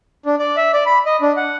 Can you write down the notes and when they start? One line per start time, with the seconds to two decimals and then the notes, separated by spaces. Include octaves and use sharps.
0.26 D4
0.39 D5
0.57 E5
0.73 D5
0.86 B5
1.06 D#5
1.22 D4
1.37 F#5